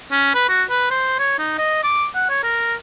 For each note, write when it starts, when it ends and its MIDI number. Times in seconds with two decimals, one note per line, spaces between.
0.12 0.30 61
0.35 0.44 71
0.49 0.63 66
0.70 0.89 71
0.91 1.15 72
1.19 1.36 73
1.38 1.55 63
1.58 1.80 75
1.83 2.06 86
2.15 2.27 78
2.30 2.40 73
2.43 2.74 70